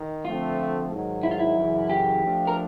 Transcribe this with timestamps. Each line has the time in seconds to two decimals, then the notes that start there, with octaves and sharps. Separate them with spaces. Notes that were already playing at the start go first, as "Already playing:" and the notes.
Already playing: D#3
0.25 D3 F3 A3 C4 F4
0.91 G#2 D#3 F#3
1.23 E4
1.31 F4
1.39 E4
1.56 F#2 C#3 E3
1.90 G4
2.22 F3 A3 D4 F4
2.47 A#4